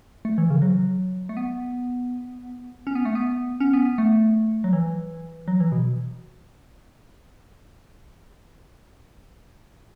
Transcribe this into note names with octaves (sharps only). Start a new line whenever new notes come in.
A3
E3
C#3
F#3
A3
B3
C#4
B3
A3
B3
C#4
B3
B3
A3
F#3
E3
F#3
E3
B2